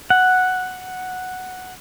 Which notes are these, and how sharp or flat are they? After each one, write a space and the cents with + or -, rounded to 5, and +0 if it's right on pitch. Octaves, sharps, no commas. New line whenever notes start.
F#5 +0